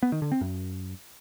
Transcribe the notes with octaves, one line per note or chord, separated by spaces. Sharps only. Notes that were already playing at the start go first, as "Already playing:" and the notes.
B3
D#3
D3
C4
F#2